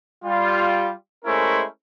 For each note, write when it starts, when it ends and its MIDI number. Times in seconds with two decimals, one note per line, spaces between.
0.24 0.91 55
0.24 0.91 65
1.25 1.63 56
1.25 1.63 57
1.25 1.63 61
1.25 1.63 64
1.25 1.63 70
1.25 1.63 72